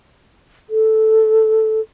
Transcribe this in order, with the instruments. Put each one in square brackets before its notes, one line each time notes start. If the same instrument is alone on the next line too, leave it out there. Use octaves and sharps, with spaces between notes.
[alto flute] A4